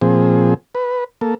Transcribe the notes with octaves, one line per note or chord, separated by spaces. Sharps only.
A#2 F3 C4 G#4
B4
A#3 A4